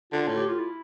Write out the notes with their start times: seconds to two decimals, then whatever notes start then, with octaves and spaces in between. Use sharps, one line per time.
0.12 D3 F4
0.28 A2
0.37 G4
0.49 F4
0.59 E4